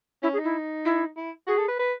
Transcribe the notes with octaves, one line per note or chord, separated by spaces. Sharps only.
C#4 E4
G#4
D#4
E4
E4
E4
F#4 G#4
A4
B4
B4